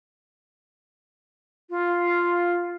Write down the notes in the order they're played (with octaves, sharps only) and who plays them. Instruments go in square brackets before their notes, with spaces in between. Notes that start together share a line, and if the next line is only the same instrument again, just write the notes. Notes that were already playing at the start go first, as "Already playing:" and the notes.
[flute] F4